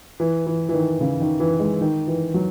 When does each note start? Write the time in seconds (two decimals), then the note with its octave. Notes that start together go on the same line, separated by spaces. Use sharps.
0.20 E3
0.46 E3
0.69 E3
0.74 D#3
1.01 C#3
1.20 D#3
1.40 E3
1.60 G#3
1.81 D#3
2.07 E3
2.34 F#3